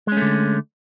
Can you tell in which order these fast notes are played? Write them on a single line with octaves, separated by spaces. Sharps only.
G#3 C#4 A3 D3